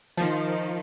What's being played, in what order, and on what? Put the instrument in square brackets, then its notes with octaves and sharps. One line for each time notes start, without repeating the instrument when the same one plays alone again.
[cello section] D#3 [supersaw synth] F3